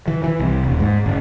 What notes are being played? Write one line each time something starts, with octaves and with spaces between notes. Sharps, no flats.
E3
E3
C2
D#1
G#2
F#1